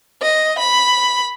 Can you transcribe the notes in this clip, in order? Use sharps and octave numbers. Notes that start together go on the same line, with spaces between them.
D#5
B5